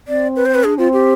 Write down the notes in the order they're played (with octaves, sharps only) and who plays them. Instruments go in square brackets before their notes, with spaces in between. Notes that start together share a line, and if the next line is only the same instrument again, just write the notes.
[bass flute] C4 [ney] D5
[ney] B4
C5
B4
[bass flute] D4 [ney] G#4
[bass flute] C4 [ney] F4
[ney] G4